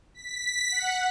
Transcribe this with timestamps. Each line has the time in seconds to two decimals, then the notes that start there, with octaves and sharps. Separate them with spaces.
0.14 B6
0.71 F#5